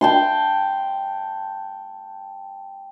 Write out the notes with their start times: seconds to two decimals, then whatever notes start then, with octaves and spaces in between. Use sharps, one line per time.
0.01 G5 A5 C6